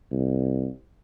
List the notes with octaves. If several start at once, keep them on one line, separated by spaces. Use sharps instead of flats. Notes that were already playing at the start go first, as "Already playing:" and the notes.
C2